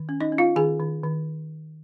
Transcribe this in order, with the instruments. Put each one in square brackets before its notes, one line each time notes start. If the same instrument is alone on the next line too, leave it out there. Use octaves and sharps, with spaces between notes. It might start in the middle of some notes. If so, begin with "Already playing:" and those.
Already playing: [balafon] D#3
C#4
D#4 D#5
C#4
F4 F5
D#3 G#4 G#5
D#3
D#3